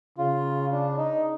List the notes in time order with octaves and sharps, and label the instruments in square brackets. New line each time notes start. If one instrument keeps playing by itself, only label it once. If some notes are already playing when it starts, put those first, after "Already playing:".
[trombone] C#3 [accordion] F4
[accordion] D4
D#4